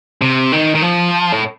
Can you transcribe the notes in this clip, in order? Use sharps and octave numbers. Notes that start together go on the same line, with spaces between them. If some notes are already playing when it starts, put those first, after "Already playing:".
C3
D#3
D#3
F3
A2